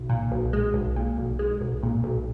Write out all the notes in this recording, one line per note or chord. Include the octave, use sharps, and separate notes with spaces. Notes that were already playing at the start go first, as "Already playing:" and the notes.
Already playing: B1
A#2
B1
G#3
B1
A#2
B1
G#3
B1
A#2
B1